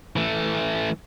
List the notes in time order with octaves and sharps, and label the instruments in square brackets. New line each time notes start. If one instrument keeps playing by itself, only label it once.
[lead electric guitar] E3 A3